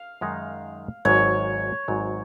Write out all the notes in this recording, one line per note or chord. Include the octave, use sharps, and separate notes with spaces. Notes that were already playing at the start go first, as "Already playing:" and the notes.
Already playing: F5
F#2 D#3 G#3 D#4
G#1 G#2 F#3 C#5
G#1 G#2 F#3